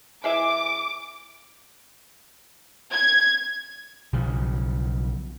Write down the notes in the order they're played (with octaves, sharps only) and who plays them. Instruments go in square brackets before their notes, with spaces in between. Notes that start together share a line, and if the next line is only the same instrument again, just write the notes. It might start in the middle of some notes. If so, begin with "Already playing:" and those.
[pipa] E3 G#4 E5 [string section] D6
[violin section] G#6
[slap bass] B1 C#3 F3